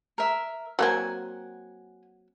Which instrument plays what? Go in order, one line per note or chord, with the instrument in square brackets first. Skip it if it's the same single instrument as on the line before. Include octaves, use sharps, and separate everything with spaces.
[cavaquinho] A#4 E5
[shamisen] F#3 A#3 C4 [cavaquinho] F#5 G#5